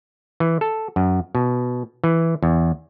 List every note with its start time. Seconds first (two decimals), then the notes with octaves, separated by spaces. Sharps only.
0.40 E3
0.61 A4
0.96 F#2
1.35 B2
2.04 E3
2.43 E2